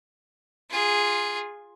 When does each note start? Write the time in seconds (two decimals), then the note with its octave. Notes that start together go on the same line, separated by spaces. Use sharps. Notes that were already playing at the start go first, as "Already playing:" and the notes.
0.70 F4 G#4